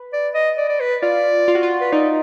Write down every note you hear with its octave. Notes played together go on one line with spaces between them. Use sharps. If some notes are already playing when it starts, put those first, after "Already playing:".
Already playing: B4
D5
D#5
D5
D5
B4
F4 D5
F4
F#4
F4
B4
D#4 D5